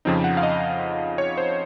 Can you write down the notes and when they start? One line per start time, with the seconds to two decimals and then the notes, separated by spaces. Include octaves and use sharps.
0.05 F2 C#3 F3 C4 D#4
0.24 F#5
0.37 F5
0.43 D#5
1.18 C#5
1.37 C5